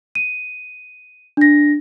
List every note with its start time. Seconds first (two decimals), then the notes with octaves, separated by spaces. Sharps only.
0.15 D#7
1.37 D4 A#6